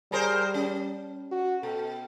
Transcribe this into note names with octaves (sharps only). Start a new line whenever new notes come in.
G3 G#4 A#4 C5
C#4
F#4
B2 A4